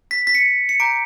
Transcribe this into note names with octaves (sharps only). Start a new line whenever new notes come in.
B6
B6
C#7
C#7
A#5 D6 G6 D7